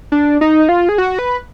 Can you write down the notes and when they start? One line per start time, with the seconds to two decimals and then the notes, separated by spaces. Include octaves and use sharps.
0.12 D4
0.41 D#4
0.69 F4
0.89 G#4
0.98 F#4
1.19 B4